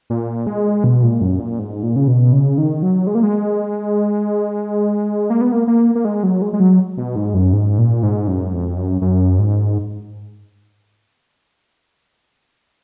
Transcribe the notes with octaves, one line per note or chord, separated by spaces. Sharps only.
A#2
G#3
B2
A#2
F#2
A#2
G#2
A#2
C#3
B2
C#3
D#3
F#3
G#3
A#3
G#3
A#3
B3
A#3
A#3
A#3
G#3
F#3
G#3
G#3
F#3
B2
G#2
F#2
G#2
A#2
G#2
F#2
F2
F#2
F#2
G#2